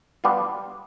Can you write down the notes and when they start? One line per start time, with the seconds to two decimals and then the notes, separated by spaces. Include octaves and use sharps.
0.24 G3 B3 D4 F4